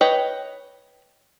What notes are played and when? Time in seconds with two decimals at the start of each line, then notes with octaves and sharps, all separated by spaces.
0.01 B4 C#5 D#5 G5